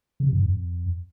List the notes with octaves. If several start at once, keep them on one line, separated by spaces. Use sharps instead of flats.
C#3
C3
G2
G#2
F2